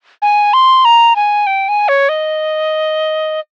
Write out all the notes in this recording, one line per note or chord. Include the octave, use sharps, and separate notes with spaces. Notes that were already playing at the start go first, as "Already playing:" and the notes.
G#5
C6
A#5
G#5
G5
G#5
C#5
D#5